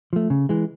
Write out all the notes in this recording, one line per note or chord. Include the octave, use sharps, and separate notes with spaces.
F3 A3
C#3
E3 G#3